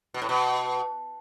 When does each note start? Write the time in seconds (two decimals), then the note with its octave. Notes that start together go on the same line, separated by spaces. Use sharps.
0.14 B2
0.22 A2
0.29 B2